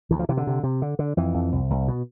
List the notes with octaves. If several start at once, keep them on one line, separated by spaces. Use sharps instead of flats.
D2 E3
F3
C3 E3
D3
C3
C3
D3
D3
F2 E3
F2
C2
C2
B2